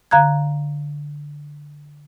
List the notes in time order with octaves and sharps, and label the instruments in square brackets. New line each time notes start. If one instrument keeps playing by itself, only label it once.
[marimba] D3 F5 A#5 F#6 G#6